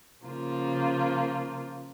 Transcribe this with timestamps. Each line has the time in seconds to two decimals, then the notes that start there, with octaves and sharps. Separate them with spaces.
0.25 C#3 F3 A#3 F4